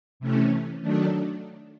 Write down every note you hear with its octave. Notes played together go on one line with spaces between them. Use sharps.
C3 E3 A3 C#4
D#3 F#3 A3 D4